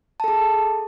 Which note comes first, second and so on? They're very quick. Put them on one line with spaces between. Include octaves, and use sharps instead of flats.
A5 A4 G#4